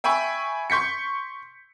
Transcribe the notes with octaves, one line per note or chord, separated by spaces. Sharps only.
E5 G5 G#5 B5 C#6
C6 C#6 G6 B6 C#7